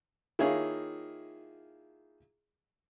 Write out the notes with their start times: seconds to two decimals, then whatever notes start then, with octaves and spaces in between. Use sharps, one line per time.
0.39 D#3 A#3 E4 F4 G#4 C#5